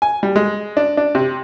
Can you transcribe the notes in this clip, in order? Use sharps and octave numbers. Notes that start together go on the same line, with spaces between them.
G#5
G3
G#3
D4
D4
C3